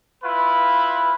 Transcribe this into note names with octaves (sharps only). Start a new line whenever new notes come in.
E4 F4 B4